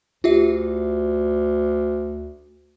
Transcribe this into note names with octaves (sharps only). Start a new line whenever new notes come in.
D2 F4 G4 E5